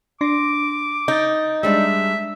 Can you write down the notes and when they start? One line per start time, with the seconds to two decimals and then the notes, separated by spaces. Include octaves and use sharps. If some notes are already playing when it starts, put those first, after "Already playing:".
0.21 D4 C6 D6 A#6
1.08 D#4 G6 A6
1.63 G3 G#3 D4 E5